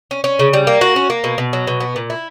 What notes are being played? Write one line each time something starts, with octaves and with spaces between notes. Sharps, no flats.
C#4
C#4
C#3
G3
A#3
F#4
C#4
A#3
B2
B2
F#3
B2
B3
A#2
E4